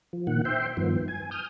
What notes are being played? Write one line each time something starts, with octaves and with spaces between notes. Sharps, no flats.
F3
A#2 D#3 F#5
C5 E5 G5 C6
G2 D#3 F3 B3
G#5
D#6 F6 G6